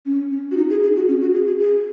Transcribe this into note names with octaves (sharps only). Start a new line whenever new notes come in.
C#4
C#4
F#4
D#4
G#4
G#4
F#4
C#4
F#4
G#4
G#4
G#4